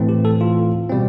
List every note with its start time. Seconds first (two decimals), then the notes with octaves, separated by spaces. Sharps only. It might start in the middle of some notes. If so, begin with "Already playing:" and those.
Already playing: A2 E3 A3 C4
0.09 G4
0.25 A4
0.41 F4
0.90 B2 G3 C4